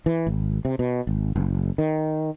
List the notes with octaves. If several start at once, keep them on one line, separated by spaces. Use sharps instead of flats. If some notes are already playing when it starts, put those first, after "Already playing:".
E3
G#1
C3
B2
G#1
F#1
D#3